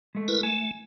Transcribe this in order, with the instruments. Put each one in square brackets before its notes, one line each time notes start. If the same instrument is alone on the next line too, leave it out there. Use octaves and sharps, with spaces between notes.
[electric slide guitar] G#3 A3
[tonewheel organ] E4 A#4 B4
[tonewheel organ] A3 [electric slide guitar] G#5